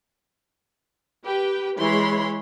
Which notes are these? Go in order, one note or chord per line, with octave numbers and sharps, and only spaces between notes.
G4 B4 G5
E3 G#3 C#5 B5 C6